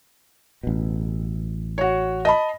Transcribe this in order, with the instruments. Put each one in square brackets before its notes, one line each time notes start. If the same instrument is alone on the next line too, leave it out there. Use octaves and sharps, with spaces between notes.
[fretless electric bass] A1 B2
[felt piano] F#4 C#5
D#5 A5 B5